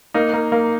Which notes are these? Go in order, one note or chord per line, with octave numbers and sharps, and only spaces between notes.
A#3 D#4
A#3
A#3